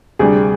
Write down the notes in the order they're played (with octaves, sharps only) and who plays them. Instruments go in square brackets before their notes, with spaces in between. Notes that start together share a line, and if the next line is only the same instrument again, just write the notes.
[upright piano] D2 C3 G3 G#4